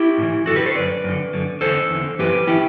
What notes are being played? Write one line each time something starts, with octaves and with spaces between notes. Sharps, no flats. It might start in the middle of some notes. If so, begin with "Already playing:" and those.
Already playing: E4 G4
A2 E3
F#2 D3 F#4 A4
G4 B4
A4 C5
F#2 D3 B4 D5
F#2 D3
F#2 D3
E2 D3 A4 C5
E2 D3
F#2 E3 G4 B4
E3 E4 G4